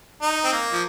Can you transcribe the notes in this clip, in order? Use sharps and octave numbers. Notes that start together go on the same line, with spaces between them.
D#4
C4
A#3
F3